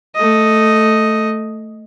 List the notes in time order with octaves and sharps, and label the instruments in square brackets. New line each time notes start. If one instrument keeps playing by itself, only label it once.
[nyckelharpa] A3 D#5